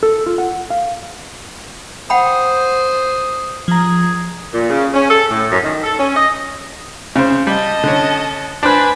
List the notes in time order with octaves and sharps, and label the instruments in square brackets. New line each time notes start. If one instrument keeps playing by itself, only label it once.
[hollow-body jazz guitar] A4
F4
F#5
F5
[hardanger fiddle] C5 [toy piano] F#5 G5 B5 [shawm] D#6
[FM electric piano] F3 A#5 [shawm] G#4
[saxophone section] A#2
C#3
C#4
A4
A2
F#2
D#3
A4
C#4
D#5
[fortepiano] C#3 C5
[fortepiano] G3 [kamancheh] D#5 A5
[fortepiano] D3 C#4
[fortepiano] D4 C5 F#6 [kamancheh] B4 G#5